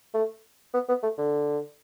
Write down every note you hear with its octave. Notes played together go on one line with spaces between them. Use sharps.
A3
B3
B3
A3
D3